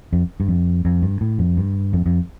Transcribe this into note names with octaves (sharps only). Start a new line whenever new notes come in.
F2
G2
F2
F2
G2
A2
F2
G2
F2
F2